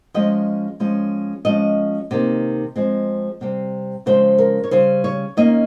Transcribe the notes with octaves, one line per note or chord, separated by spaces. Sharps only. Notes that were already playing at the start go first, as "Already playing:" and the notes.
F3 G#3 C#4 D#5
F3 G#3 C#4
F3 G#3 C#4 D#5
C3 D#3 A#3
F3 G#3 C4
C3 G3 C4
C#3 F3 G#3 C#4 C5
A#4
C#5
C#3 G3 C#4 C5
C#5
D#3 A#3 C#4 D#5